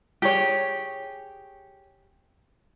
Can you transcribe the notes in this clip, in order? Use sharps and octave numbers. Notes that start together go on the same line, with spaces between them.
G4 G#4 C#5